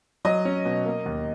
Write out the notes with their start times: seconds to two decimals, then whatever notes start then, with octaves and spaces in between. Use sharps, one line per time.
0.25 F#3 D#5
0.45 C#4
0.65 B2
0.86 A#3
1.06 D#2